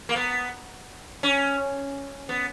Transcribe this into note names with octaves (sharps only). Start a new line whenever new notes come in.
A#3
B3
C#4
B3